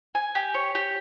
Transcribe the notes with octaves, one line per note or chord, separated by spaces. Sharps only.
G#5
G4
C#5
G4